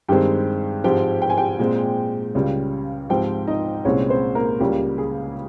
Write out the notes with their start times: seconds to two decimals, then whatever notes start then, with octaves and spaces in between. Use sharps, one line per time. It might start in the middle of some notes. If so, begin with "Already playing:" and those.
0.09 G2 D#3 G#3 C4 G4 G5
0.84 G#2 F3 G#3 C4 G4 G5
1.22 G5
1.30 G#5
1.38 G4 G5
1.59 A#2 G#3 C4
2.35 C#2 C#3 G3
3.10 G#2 F3 C4 G4 G5
3.47 D#4 D#5
3.85 C2 A#2 G#3 C4 C#4 C#5
4.10 C4 C5
4.35 A#3 A#4
4.60 C#2 C#3 G3 A#3 G4
4.98 G#4